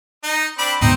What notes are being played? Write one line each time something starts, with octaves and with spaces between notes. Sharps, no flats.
D#4
C4 D4 B5
D2 G#2 B2 C4 D#4